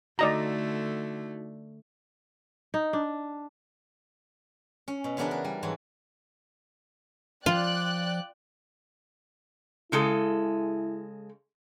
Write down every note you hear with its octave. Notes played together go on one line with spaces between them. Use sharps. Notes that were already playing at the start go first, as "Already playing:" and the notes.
D3 A3 D#4 F#4 D5 D#5 A#5
D#4
D4
C#4
B2
C#3 E3 B3 D4 A#4 B4
A#4
G3
G#2 E3 F#3
F3 F4 D5 G5 F#6
C#3 G#3 E4 A4